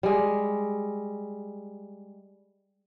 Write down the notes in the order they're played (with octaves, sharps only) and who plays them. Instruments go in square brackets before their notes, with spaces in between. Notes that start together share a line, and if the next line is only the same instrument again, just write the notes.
[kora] G3 G#3